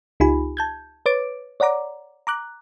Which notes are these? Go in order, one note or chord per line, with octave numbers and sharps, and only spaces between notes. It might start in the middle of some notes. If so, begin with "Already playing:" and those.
C#2 D#4 F4 G4 G#5 B5
A5 G6 G#6
B4 C#5 D6 A6 D7
C#5 D5 F#5 A#5 D6
A#5 D6 F#6